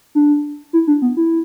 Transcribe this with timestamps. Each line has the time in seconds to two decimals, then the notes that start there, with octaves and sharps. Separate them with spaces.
0.15 D4
0.73 E4
0.87 D4
1.02 B3
1.17 E4